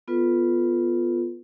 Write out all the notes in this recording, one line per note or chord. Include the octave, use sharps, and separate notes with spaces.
B3 F4 A4 B4